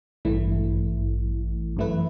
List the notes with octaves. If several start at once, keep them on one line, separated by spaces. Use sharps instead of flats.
A1 G2 E3 A3 E4
F#2 E3 A3 E4 B4